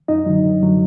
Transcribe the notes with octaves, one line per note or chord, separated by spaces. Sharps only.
F#2 D#4 D#5
D3 F#3
F#2
D3 F#3